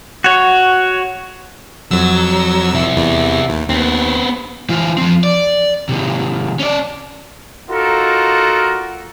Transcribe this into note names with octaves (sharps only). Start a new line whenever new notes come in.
F#4 C#5
F2 F#3 E6
C3 E4
E2
D#2
D#2 B3 C4
E3 F4
F3 C4
D5
C3 D#3
C#4 D5
D#4 F4 F#4 A4 A#4